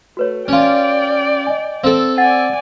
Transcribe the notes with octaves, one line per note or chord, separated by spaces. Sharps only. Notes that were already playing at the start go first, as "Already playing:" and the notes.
A3 F#4 B4 C#5
C#4 F4 D5 G5
D#5 G#5
C4 A4 F5
D5 F#5 G#5 A6